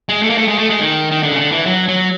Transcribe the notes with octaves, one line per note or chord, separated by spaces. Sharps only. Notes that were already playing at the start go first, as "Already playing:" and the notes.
G#3
A3
A#3
A3
G#3
A3
G#3
D#3
D#3
D3
C#3
D3
E3
F#3
F#3